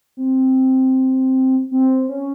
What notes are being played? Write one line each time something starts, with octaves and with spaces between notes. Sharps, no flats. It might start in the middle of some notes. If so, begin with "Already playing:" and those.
C4
C4
C#4